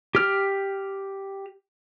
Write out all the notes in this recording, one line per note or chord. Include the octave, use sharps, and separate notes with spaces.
G4 F6